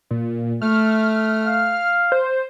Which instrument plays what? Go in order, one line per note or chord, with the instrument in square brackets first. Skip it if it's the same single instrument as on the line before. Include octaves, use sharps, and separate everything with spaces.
[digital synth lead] A#2
[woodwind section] A3 [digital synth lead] F6
[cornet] F5
[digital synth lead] C5